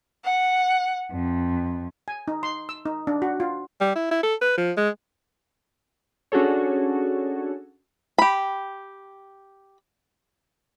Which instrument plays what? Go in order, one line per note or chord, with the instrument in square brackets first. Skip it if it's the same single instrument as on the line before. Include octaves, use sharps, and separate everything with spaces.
[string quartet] F#5
F2
[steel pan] G#5
D#4
C6
E6
D#4
D4
F#4
F4
[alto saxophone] G3
E4
E4
A4
B4
F3
G#3
[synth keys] C#4 D4 F#4 G#4 A4 C#5
[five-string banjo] G4 B5